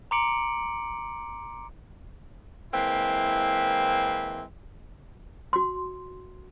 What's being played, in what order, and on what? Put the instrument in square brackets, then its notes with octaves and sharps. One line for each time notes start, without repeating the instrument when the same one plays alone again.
[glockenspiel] A#5 C6 D6 C#7 D7 F#7
[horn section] E3 G#3 A#3 C4 E4
[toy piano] F#4 C6